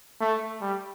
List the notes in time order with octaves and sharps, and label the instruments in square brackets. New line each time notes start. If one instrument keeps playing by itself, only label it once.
[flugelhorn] A3
G3